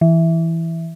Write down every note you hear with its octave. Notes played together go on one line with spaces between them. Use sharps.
E3